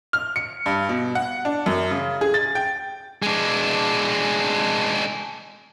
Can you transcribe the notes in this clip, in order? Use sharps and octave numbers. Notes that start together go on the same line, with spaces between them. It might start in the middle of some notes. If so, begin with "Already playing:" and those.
F6
C#7
G2
B2
F#5
D4
F#2
C#3
G#4
A6
G5
G#3 D4